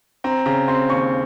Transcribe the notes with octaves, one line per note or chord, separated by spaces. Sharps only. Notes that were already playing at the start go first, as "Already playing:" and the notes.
C4 A#5
C#3 A#5
C4 C6
D#2 C#6